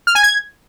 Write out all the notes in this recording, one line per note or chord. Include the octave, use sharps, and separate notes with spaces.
F6
G#5
G#6